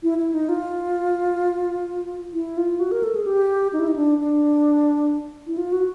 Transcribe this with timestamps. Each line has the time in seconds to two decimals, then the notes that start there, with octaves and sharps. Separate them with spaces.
0.03 E4
0.18 E4
0.34 D#4
0.49 F4
2.33 E4
2.57 F4
2.80 F#4
2.92 A#4
3.03 A4
3.15 G#4
3.26 G4
3.73 D#4
3.80 E4
3.88 D#4
3.96 D4
4.19 D4
5.47 E4
5.58 F4
5.72 F#4